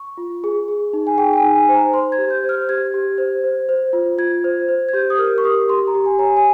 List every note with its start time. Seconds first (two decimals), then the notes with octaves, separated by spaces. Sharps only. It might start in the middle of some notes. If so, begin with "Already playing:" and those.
Already playing: C#6
0.18 F4
0.44 G#4
0.68 G#4
0.93 D#4
1.07 G#5
1.18 G#4 G5
1.33 G5
1.37 G#5
1.43 D#4
1.55 G#5
1.69 C5
1.75 A#5
1.93 C5 C6
2.12 G#6
2.18 G4
2.30 G6
2.44 C5
2.49 F6
2.69 G4 G#6
2.94 G4
3.18 C5
3.44 C5
3.69 C5
3.93 F4
4.18 F4 G#6
4.44 C5
4.69 C5
4.89 G#6
4.93 G4 G6
5.10 D#6
5.18 A#4 F6
5.38 C#6
5.44 G4 D#6
5.69 G4 C6
5.87 A#5
5.94 G4
6.06 G#5
6.19 C#5 A#5
6.26 G#5
6.37 G#5